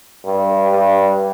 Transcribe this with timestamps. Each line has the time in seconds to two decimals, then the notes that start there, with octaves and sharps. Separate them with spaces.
0.25 G2
0.71 G2